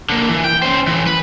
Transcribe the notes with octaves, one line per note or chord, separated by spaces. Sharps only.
D3 A#3
E3
G5
C#4 C5
A2 E3
B4